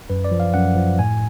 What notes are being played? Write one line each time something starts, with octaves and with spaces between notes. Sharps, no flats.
F#2 B4
D5
F3
F5
F#2 F#5
F3
A2 G#5